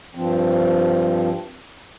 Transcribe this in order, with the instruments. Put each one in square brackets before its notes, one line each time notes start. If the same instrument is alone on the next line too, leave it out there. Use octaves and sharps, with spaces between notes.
[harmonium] G2 F3 C4